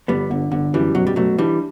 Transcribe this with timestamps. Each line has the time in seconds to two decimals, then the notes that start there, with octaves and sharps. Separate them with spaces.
0.08 G1 G3 B3
0.30 G1 D3
0.52 G1 D3
0.73 F#2 E3 G3
0.95 B2 F#3
1.07 G3
1.16 B2 F#3 A3
1.38 E3 G3 D4